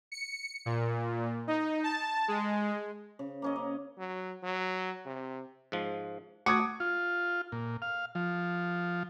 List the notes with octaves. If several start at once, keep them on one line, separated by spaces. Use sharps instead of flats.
C#7
A#2
D#4
A5
G#3
C#3
A#3 C#4 D#5
A#3
F#3
F#3
C3
G#2 F3
A3 F#4 D6 D#6 G#6
F4
A#2
F5
F3